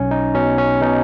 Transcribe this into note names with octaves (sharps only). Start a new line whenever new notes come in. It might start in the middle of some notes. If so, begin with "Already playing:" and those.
Already playing: B1 C#4
D#4
B2 C#4
C#4
B2 D#4